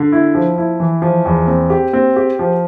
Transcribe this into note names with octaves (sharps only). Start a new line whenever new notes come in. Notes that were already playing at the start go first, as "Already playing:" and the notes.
Already playing: D3
E4
F3
E4
E3
F3
E2
C4
G4
C4
G4
F3